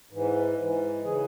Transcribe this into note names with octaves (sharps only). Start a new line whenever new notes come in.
G#2 E3
G#2 E3
C#3 E3 G#4